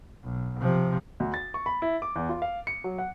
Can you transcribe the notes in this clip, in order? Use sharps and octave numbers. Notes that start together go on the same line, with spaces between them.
B1
C3 F3
D2
A6
C#6
B5
E4
D6
E2
F4
F5
C#7
F#3
F#5